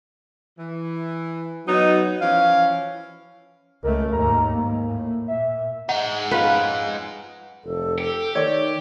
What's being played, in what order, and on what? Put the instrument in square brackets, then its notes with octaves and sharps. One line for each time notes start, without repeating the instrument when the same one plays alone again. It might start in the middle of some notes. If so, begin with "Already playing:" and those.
[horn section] E3
[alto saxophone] F#3 [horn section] B3 D#4
[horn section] E3 F3 C#4 [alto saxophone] F5
[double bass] C#2 A3 [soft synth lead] A#4
[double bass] D#2 G#2 [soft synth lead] A#5
[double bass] G#2 [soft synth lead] A#3
[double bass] A2
[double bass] A#2 [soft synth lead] E5
[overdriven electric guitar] G#3 D#4 [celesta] F#5
[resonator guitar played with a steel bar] F2 C#4 F4 [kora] B4
[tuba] F1 [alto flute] A4
[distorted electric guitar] G4
[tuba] D#3 [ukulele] C#5 D5